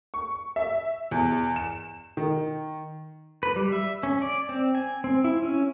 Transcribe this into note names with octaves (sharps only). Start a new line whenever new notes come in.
C#6
E5
E2
E7
D#3
B4
G3
E5
C#4
D5
C4
G#5
C4
E4
C#4